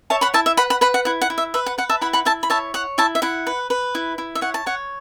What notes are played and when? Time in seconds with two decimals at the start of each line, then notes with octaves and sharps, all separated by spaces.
0.10 C#5 E5 A5
0.21 F#5 B5
0.34 E4 E5 A5
0.46 E5
0.57 B4 F#5 B5
0.70 F#5 B5
0.81 B4 F#5 B5
0.94 F#5
1.05 E4 F#5
1.22 F#5
1.30 E4
1.38 E5
1.54 B4 E5
1.66 F#5
1.78 B4 F#5
1.90 E5 A5
2.01 E4 F#5 B5
2.13 F#5 B5
2.25 E4 E5 A5
2.43 B5
2.50 C#5 E5 A5
2.74 C#5 F#5
2.98 E4 E5 A5
3.15 E5
3.22 E4 F#5
3.47 B4
3.70 B4
3.95 E4
4.18 E4
4.35 E5
4.41 C#5 F#5
4.54 A5
4.66 C#5 F#5